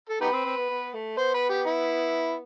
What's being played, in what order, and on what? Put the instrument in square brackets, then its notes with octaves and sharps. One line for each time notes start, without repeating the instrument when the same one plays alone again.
[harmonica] A4
[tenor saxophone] B3 [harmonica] D#4 G4 B4
[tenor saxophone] C4
C4
B3
B3
A3
[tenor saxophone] B3 [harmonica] C5
[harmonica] B4
G4
E4